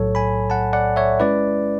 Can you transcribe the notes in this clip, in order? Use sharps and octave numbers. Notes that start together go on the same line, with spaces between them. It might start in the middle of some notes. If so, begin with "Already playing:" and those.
Already playing: B1 A2 F#3 A4 C#5
G#5 B5
F#5 A5
D5 F#5
C#5 E5
G#3 C#4 E4 B4 D5